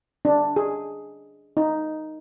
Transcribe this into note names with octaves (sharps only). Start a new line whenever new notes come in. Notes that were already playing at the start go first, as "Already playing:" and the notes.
D4
G#4
D#4